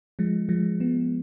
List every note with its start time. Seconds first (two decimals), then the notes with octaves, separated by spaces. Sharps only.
0.19 F3 G#3
0.49 F3 G#3
0.80 G#3 B3